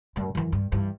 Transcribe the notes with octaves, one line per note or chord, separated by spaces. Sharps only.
F#2 A3
F#2 E3
G2
G2 E3